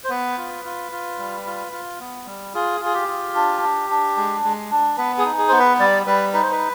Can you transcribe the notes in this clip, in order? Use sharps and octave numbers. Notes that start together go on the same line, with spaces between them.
C5
B3 B4
F4
F4
F4
G3
F4
F4
B3
G3
F4 G#4
F4 G#4
G4
F4
D4
D4
D4
G#3
G#3
D4
B3 B4
G#4
D#4
G#4
B3 C5
B4
G3 D5
G3 B4
D#4 B4
C5
B4